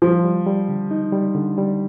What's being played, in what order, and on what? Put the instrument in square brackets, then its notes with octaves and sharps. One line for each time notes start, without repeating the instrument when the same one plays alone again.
[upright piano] F3 [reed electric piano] G3
[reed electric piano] G3
G3
D3
D#4
G3
D3
G3